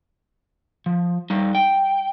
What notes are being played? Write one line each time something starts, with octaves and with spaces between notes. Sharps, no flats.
F3
G3 D#4
G5